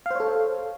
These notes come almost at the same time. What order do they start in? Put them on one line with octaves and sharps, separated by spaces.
F5 C5 C#5 A4